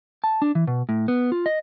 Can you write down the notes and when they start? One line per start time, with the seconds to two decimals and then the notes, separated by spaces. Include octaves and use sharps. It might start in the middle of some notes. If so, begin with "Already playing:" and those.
0.24 A5
0.42 D4
0.55 E3
0.67 B2
0.89 A2
1.08 B3
1.32 F4
1.46 D#5